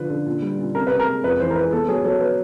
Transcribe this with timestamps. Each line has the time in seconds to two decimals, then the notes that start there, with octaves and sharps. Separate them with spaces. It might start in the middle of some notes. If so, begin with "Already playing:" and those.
Already playing: D3 F3 B4
0.10 D3
0.26 A#2
0.42 G3
0.59 A#2
0.75 C3 A#4
0.87 C3 B4
1.00 A#4
1.08 G#3
1.24 F2 B4
1.40 E3 C5
1.51 A#4
1.56 G#3 B4
1.73 B3 A4
1.88 F#3 G#4
2.05 F#3 A4
2.21 B4